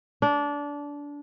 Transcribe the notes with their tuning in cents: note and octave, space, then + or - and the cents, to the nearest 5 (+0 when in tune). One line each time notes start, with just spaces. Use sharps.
D4 -20